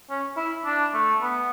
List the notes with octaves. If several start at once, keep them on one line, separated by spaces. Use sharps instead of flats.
C#4
E4
D4
A3
B3